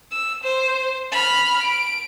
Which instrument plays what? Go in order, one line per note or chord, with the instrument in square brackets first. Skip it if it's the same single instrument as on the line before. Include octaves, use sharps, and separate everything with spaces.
[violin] E6
C5
B5 F6
D7